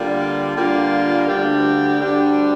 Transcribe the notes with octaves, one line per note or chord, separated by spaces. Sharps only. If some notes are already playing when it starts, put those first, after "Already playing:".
Already playing: D3 G3 A#3 F4
D3 G3 A#3 F4
D2 D3 G3 D4 G4
D2 D3 G3 D4 G4